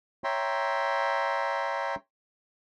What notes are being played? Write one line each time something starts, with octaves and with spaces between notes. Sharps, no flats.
C#5 E5 G5 A#5 C6